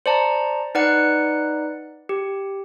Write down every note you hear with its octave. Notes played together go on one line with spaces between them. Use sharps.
C5 D5 A5 A#5
D#4 B4 D5 F#5 F#6 C#7
G4